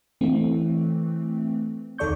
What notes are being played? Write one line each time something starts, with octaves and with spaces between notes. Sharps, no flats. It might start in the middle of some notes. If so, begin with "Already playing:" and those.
E3 A3 C4
D#2 D#3 A4 D5 C#6 G6